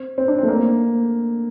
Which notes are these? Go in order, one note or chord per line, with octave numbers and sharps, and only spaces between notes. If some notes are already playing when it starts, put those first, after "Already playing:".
Already playing: C4
C4
D4
C4
A3
A#3